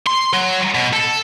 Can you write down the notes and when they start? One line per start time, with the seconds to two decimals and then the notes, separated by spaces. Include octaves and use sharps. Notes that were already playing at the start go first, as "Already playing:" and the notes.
0.07 C6
0.34 F#3
0.75 B2
0.93 A4